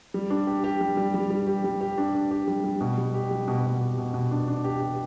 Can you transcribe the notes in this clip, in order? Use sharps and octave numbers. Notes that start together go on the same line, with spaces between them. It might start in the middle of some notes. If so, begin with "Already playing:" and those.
G3
D4
G4
G4
G3
G3
G3
G3
G4
G3
G4
D4
D4
G4
G3
G3
B2
G3
G4
G3
B2
B2
G4
B2
B2
D4
D4
G4
G4